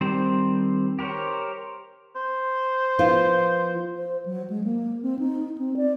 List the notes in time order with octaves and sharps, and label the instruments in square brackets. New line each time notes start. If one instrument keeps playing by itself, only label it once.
[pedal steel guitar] D#3 G3 C4 C5
G4 A#4 C5 C#5
[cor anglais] C5
[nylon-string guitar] F3 B3 F4
[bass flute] C5
F#3
G#3
A#3
C4
D#4
C4
D5